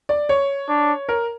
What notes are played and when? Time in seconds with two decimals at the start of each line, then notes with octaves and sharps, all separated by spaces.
0.09 D5
0.29 C#5
0.69 D4
1.09 A#4